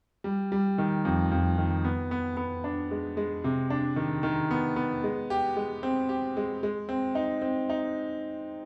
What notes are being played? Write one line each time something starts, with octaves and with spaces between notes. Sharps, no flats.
G3
G3
D#3
F2
F2
D#3
B3
B3
B3
D4
G#3
G#3
C3
D4
D#3
D#3
B3
B3
G#3
G4
G#3
C4
G4
G#3
G#3
C4
D#4
C4
D#4